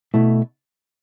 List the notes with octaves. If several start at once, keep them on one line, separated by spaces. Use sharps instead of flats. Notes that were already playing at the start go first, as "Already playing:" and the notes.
B2 A3 E4